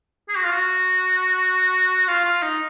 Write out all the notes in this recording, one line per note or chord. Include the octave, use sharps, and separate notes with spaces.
G#4
F#4
F4
F#4
F4
F4
D#4